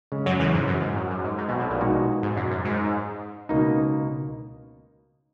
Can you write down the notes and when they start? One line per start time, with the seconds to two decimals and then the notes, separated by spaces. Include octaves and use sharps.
0.12 C#3 G#3 C#4
0.26 F#2 F#3
0.40 E2 E3
0.54 G#2
0.68 F#2
0.82 G#2
0.96 F#2
1.10 F#2
1.24 G#2
1.38 G#2
1.48 B1 B2
1.59 B1 B2
1.70 A#1 A#2
1.81 B2 G#3 D#4 F#4
2.23 G#2
2.36 F#2
2.51 F#2
2.65 G#2
3.49 C#2 B2 A#3 D#4